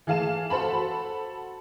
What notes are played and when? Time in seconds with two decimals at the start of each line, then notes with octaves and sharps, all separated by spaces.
0.07 E3 G#4 F5 A5 E7
0.50 F#4 A4 C5 A5 B5